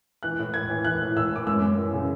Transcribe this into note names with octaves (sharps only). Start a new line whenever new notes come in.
E3 F#6
A2
A2 G#6
E3
E3 F#6
A2
A2 E6
E3 D6
F#2 E6
F#2
E3
C#3